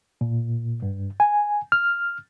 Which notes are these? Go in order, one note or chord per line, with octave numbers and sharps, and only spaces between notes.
A#2
G2
G#5
F6